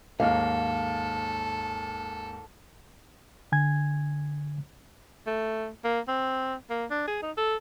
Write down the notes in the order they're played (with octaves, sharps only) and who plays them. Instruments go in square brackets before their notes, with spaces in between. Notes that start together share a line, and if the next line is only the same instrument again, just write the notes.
[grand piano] D#2 G#2 A#3 [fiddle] A4 [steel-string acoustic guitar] F5
[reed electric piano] D3 G#5 G#6
[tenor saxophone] A3
A#3
C4
A#3
D4
G#4
D#4
A4